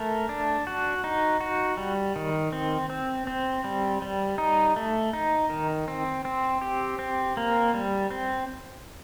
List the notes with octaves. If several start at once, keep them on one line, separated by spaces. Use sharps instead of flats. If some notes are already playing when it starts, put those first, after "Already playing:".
Already playing: A3 A#4
D4
F#4
D#4
F#4
G3
D#3
C4
C4
C4
G3
G3
D#4
A3
D#4
D#3
C4
C4
G4
C4
A#3
G3
C4